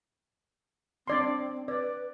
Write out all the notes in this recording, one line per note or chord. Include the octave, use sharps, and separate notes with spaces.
C4 D4 D5 C6
B4 D5